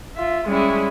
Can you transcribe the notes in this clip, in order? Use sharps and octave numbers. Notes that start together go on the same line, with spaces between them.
F4 E5
G3 G#3 C#4 E4